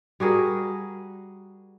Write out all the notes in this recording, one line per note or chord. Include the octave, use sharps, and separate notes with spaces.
G3 F#4 G#4 A#4